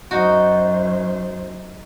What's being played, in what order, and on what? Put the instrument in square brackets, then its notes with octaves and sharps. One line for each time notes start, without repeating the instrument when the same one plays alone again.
[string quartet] F#2 C5 [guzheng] D#4 F#4